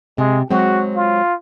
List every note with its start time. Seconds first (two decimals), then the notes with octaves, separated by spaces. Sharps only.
0.18 C3 G#3
0.51 F#3 G#3 C4 F#4
0.96 F4